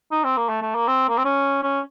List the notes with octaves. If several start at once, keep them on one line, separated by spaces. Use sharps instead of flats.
D#4
C4
A#3
A3
A3
A#3
C4
A#3
C4
C#4
C#4